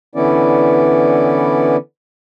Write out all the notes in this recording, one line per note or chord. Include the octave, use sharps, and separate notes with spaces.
D3 E3 B3 C#4 E4 D5